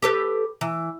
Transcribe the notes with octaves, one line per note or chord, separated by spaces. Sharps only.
G4 A4 B4
E3